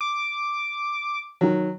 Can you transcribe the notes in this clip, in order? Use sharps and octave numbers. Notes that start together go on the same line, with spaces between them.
D6
D#3 F#3